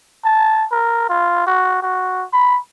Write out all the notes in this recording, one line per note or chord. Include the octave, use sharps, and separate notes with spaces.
A5
A#4
F4
F#4
F#4
B5